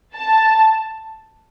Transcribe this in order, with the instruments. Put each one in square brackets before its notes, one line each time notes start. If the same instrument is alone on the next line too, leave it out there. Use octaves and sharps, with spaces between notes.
[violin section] A5